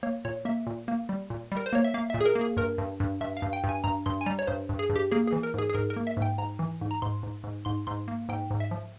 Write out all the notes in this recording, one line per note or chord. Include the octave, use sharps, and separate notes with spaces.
A#3 C#5
A#2 C#5
A#3 E5
A#2
A#3
G3
A#2
G3 A#4
C5
A#3 C#5
E5
A#3 F5
A#2 E5
G#4
A#4
A#3
G#4
G2 A#4
G2
G2
G2 E5
F5
G2
G5
G2
G#5
G2 A#5
G2 C6
G#5
G3 A#5
C#5
G2 C5
G2
G#4
G2
G4
A#3 G#4
G#4
E3
A#4
G#2 G#4
G#4
G#2 A#4
A#4
A#3
E5
G#2
G5
G#2 A#5
E3
G#2
A#5
G#2 C6
G#2
G#2
G#2 C6
G#2 C6
A#3
G#2 G5
G#2
E5
F3